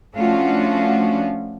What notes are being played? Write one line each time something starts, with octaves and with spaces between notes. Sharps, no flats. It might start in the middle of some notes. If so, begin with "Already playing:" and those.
F3 A3 C#4 D4 F4 F#4